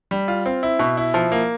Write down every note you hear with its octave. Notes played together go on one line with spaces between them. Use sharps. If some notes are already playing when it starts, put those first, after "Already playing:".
G3
F4
C4
E4
B2
E4
F3
A#3